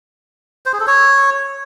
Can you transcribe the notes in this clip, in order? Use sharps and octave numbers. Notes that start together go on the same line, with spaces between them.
C5
G#4
A4
C#5